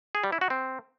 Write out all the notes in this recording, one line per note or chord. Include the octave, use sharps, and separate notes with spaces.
G#4
G3
E4
F#4
C4